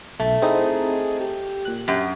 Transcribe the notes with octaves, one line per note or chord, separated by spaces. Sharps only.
B1 A3
C4 D#4 E4 G#4
G4
A#2 F#6
F#2 G4